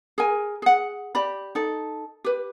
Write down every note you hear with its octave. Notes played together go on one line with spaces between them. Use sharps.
G#4 A#4 G#5
G#4 F#5
G4 D5 B5
D#4 A4
G4 B4